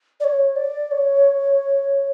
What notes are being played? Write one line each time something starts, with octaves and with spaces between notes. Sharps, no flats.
D5
C#5
D5
C#5